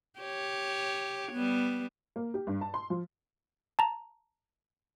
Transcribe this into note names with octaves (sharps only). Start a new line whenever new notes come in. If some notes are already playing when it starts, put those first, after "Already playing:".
G4 C#5
G3 B3
A#3
G4
G2
A5
C6
F3
A5 A#5